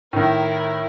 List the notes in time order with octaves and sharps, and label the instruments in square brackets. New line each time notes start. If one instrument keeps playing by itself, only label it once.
[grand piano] A2 D#3 [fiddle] E4 A#4